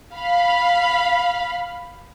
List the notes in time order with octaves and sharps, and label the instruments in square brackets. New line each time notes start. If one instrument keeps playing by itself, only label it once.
[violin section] F5 B5